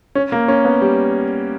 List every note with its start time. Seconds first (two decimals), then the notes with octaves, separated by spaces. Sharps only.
0.15 C#4
0.32 A#3
0.48 C#4
0.65 B3
0.82 G3